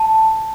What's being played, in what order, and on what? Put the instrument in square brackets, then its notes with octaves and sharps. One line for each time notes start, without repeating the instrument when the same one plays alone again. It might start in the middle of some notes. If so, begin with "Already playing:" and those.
Already playing: [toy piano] A5